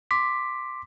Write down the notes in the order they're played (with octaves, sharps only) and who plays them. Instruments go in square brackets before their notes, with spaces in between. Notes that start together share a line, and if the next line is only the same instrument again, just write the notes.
[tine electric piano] C6 D6 B6